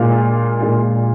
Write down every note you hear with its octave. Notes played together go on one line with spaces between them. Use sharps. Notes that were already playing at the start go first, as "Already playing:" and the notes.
Already playing: A#2 G#3 D4 F4 F5
A#2 G#3 D4 F4